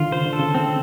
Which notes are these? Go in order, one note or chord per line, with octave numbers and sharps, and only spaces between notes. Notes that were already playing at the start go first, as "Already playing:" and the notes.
Already playing: D3 D#3 F4
C#3 C5
D3
A4
C#3
C4